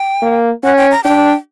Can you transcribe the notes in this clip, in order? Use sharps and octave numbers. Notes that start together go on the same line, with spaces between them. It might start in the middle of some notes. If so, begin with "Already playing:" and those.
Already playing: G5
A#3
C#4 F#5
G5
A#5
D4 G5